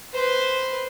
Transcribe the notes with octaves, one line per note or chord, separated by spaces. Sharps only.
B4 C5